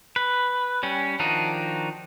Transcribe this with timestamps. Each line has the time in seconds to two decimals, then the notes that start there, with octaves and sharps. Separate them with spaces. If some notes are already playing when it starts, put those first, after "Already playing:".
0.16 B4
0.83 G3 C#4
1.19 D#3 F3 D4 D#4 F#4